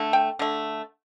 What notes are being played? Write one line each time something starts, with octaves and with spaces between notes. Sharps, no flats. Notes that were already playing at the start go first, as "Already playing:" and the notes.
Already playing: D3 A3
G5
D3 A3